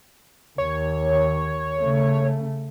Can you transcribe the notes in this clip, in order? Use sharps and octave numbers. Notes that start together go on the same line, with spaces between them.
D#2 C#5
C#3 A3